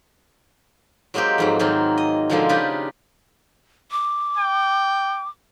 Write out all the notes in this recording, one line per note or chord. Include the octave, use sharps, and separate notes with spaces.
F#3 G#3 A#3 C4 G4
F2 G#2 F#3
G#2 D#3 F#3 A#3 C4 F4
D#5
B2 D3 F3 G#3 A#3 C4
C#3 D4 D#4 F4 G4 B4
D6
G5